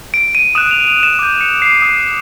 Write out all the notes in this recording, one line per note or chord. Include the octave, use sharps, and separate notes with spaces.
D7
D#7
D#6 F#6 E7
F7
F7
E7
D6 G6 D#7
C#7
C7
D#6 G6